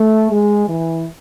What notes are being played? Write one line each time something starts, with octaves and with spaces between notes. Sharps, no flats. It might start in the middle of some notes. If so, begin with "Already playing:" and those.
Already playing: A3
G#3
E3